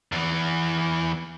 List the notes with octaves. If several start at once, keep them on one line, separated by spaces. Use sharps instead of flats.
E2 E3